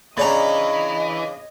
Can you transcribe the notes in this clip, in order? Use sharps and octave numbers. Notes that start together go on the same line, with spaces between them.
C#3 E3 C#4 D4 D5 D#5 A#5